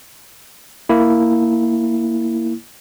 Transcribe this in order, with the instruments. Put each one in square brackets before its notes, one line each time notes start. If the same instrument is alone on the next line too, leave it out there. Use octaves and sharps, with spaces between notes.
[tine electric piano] A#3 E4